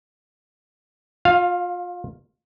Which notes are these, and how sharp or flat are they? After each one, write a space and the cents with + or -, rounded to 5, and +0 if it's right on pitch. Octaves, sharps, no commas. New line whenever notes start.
F4 +25 F5 +0